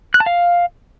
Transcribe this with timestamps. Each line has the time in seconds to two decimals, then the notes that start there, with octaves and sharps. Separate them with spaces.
0.14 F#6
0.20 A5
0.26 F5